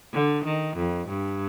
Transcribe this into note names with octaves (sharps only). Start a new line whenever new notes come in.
D3
D#3
F2
G2